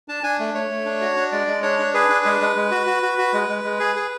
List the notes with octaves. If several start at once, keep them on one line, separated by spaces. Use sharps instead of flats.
D4 A5
D4 G#5
A3
A3 C#5
A3
D4
F#4
D4
G#3 D5
G#3
D4 C#5
D4
G#4 B4
D4
G#3
G#3
G#3
F#4
F#4
F#4
F#4
G#3
G#3
G#3
G#4
G#4